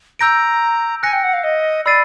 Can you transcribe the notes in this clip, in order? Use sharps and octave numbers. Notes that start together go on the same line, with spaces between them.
A#5 E6 G6 A#6 D7
G#5 F#6 A#6 C#7
G5
F#5
F5
D#5
D5 B5 E6 A6 C7 D#7